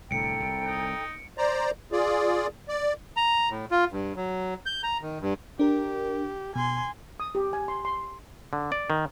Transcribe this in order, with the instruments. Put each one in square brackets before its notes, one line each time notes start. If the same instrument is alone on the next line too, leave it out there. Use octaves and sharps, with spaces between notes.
[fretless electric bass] C2 A2 D3 [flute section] A4 G5 A#5 [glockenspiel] C#7 D7
[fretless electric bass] C2
[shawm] D#4
[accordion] C5 D5 A#5
F4 G#4 D5
D5
[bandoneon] A#5
A2
F4
G2
F#3
G6
A#5
D#3
G2
[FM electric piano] D4 A#4 [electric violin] G4
[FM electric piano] B2 [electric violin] G#5 C6
[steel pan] D#6
G4
G#5
C6
C6
[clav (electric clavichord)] D3
D5
D#3